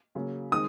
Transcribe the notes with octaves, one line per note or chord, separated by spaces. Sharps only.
C#3 F#3 A#3
D#3 G#3 C4 D#6